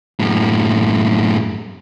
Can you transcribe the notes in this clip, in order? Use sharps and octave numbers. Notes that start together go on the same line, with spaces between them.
F#2 A2